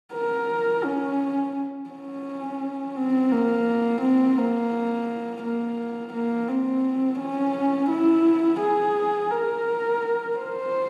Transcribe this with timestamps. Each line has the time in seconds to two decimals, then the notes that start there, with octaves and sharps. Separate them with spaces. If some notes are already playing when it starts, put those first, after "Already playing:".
0.14 A#4
0.85 C#4
1.90 C#4
2.96 C4
3.32 A#3
4.02 C4
4.37 A#3
5.42 A#3
6.13 A#3
6.49 C4
7.20 C#4
7.90 E4
8.61 G#4
9.31 A#4
10.37 C5